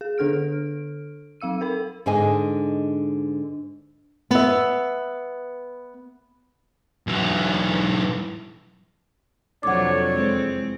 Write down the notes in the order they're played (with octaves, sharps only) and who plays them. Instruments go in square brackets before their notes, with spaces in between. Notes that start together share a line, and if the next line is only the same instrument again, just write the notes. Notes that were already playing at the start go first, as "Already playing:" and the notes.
[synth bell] G#4
D3 D4 A4 F6 D7
F#3 C4 F5 E6 D#7
A4 A#4 B5
[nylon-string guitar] G#2 D3 D4 G#4 D#5 G#5
B3 E5
[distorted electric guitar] B1 E3
[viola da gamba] F2 C3 F#3 [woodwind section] D4 A4 C#5 [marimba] F#5 D6
[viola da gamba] E2 G#3 C4